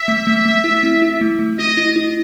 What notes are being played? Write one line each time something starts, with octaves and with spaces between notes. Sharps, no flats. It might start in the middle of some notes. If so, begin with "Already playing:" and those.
Already playing: E5
A3
A3
A3
E4
C4
E4
A3
A3
E4 D#5
E4
E4